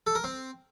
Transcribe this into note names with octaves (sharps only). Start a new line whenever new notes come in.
A4
A#4
C4